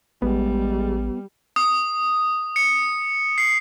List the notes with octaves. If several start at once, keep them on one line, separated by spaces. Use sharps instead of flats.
A1 G3 G#3 B3
D#6
C#7
C7